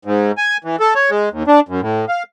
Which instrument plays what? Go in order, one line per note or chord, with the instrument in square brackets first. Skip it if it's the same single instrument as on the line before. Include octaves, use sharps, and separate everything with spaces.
[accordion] G#2
G#5
E3
A4
C#5
G#3
D#2
D4
F#2
A2
F5